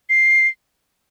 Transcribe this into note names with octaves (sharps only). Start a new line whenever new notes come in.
C7